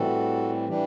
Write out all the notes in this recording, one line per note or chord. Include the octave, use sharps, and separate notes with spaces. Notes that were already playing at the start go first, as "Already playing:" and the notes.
Already playing: A2 E3 G3 C4 F#4 A4
E3 G3 D4 G4